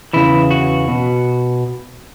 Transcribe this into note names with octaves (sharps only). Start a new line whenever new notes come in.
E2 C#3 E3 E4
F#4
B2